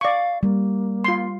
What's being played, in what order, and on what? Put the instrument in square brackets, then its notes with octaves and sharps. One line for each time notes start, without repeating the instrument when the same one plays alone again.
[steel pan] D5 C#6 [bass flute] F5
[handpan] G3 [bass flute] A#3
[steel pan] F4 C6